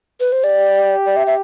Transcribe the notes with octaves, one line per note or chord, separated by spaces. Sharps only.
B4
C5
G4 D5
D5
E5
E5